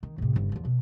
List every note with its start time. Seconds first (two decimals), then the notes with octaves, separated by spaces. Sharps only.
0.03 D#3
0.18 A2 C3
0.36 G1 C#3
0.52 E2 F3
0.65 B2